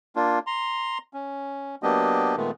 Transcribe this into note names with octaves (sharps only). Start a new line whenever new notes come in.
A#3 D4 F4
A#5 C6
C#4
F#3 A#3 B3 D4 G4 D#5
A#2 D#3 G#3 A3 B3